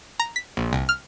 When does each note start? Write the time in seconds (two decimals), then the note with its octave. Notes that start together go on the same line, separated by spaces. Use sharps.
0.19 A#5
0.36 B6
0.57 A#1
0.73 C2
0.89 F6